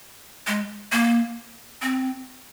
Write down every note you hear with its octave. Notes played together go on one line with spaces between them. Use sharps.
G#3
A#3
C4